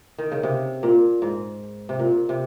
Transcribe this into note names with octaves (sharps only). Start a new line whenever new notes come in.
D#3
C#3
C3
A#2
G#2
C3
A#2
C3